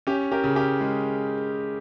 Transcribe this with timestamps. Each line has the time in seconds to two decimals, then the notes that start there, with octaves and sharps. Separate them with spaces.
0.07 C#4 G4
0.32 G4 A#4
0.44 C#3
0.56 G4
0.81 G#3